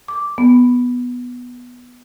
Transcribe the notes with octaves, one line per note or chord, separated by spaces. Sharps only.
D6
B3